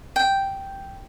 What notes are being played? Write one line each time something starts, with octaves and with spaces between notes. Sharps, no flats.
G5